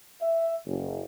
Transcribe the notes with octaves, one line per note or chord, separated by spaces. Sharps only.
E5
F#1